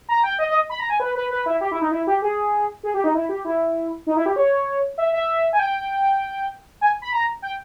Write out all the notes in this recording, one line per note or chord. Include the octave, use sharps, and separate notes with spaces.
A#5
G5
D#5
D#5
B5
A#5
G#5
B4
B4
B4
E4
G4
E4
D#4
E4
G4
G#4
G#4
G4
D#4
E4
G4
E4
D#4
E4
G4
C#5
E5
E5
G#5
G5
G#5
B5
A#5
G5